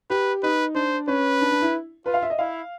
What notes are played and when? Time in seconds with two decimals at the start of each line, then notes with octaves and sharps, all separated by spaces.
0.10 G4 B4
0.43 D#4 B4
0.75 D4 C5
1.08 C#4 B4
1.41 D4
1.51 D4
1.62 E4
2.06 F4 B4
2.14 F5
2.22 E5
2.30 D#5
2.39 E4 F5